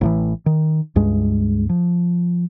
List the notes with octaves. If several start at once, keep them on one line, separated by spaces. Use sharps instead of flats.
A1 A2 E3
D#3
C#2 G2 G#3
F3